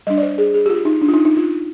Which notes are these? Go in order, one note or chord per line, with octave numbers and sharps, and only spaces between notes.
G3 D4 D#5
D5
C5
G#4
G#4
G4
F4
D#4
D4
F4
D#4
D#4
F4